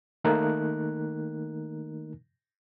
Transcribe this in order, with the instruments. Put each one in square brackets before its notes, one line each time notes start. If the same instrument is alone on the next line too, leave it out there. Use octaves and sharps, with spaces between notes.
[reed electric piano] D#3 A3 A#3 D#4 A#4 F#6